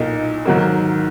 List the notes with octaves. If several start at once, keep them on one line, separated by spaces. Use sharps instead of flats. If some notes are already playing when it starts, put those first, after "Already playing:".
Already playing: B1 A#2 A#3 D#4
G#2 D#3 F#3 A#3